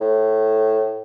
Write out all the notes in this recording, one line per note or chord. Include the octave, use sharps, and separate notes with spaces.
A2